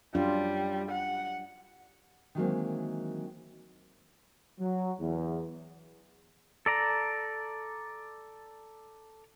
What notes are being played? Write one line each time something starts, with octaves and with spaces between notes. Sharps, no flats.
F#2 F#3 G3 D4 F4
F#5
D#3 E3 F#3 G#3 A#3 C4
F#3
E2
A4 D5 A#5